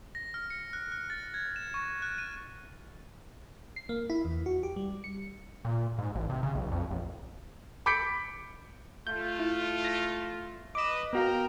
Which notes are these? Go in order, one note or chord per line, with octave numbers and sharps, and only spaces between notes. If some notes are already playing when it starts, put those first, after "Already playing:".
A#6
F6
C#7
F#6
F#6
A6
G#6
E7
C#6
F#6
D#7
C7
A#3
E4
E2
F#4
G4
G3
C#7
A#2
G#2
A1
C3
C#3
B1
F2
A#1
B5 D6 G6 B6 C#7 D7
A3 F4 G6
E4
A#6 B6
B4 D#5 D6 E7
B3 F#4 A#4 F5 G5 A#5